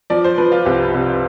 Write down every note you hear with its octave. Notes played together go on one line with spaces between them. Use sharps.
F3 D5
C5
F3 B4
F4
C2 G4
C3